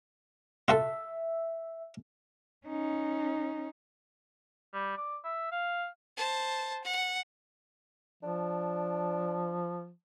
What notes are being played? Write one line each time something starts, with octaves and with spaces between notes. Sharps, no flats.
F4 F#4 A4 E5
C#4 D#4
G3
D5
E5
F5
C5 A5
F#5
F3 D4